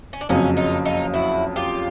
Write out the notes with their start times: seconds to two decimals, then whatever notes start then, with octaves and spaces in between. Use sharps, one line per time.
0.13 C#4
0.21 D4
0.29 F#1 F2 C#3 F#3 C#4 D#4
0.57 D#4 F4
0.85 D#4 F4
1.14 E4 F#4
1.56 F4 G4